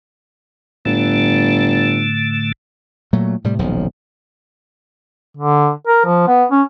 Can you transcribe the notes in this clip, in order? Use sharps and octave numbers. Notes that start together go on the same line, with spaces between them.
G1 A2 D3 A3
A#2 F#3 A3
A2 C3 G3
D#1 B1 F3
D3
A#4
F3
B3
C#4